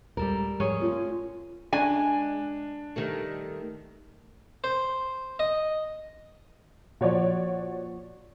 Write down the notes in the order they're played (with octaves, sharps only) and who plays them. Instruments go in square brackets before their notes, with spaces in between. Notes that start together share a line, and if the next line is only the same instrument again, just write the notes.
[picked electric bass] D#1 G#3 [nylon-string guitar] G3 A4 A#4
[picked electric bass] G#2 F3 G#3 [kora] C#4 G#4 C#5
[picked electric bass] A3 C4 [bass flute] F4
[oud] G#3 [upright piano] D4 [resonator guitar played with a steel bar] G#5
[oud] D#3 G3 A3
[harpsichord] C5
D#5
[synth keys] A#2 F3 [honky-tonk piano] F#4 C#5 D5